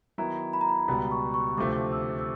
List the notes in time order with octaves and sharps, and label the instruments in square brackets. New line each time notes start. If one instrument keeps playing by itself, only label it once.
[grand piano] D#3 F#3 B3 E4 [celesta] A#5
[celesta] B5
A#5
B5
[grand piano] C#2 B2 G3 B3
[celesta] C#6
C#6
[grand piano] D2 C3 F3 A3 C4 [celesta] D6
[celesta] E6
E6